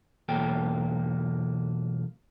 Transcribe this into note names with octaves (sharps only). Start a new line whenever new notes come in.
B1 E2 A#3 A4 G5